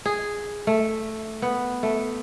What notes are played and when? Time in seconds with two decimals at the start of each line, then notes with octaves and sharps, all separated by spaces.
0.06 G#4
0.67 A3
1.42 B3
1.83 A3